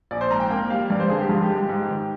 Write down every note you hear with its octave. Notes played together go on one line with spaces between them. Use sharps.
A#1 D5
C5
G#2 A#5
G5
A#3 G5
G3 F5
G2 D5
C5
D3 G#4
G4
G2 F4
G4
G#3
G4
G#2
D#3